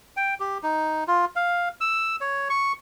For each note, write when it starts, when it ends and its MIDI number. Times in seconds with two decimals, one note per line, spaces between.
0.17 0.34 79
0.40 0.58 67
0.63 1.04 63
1.08 1.25 65
1.36 1.69 77
1.81 2.16 88
2.21 2.48 73
2.50 2.72 85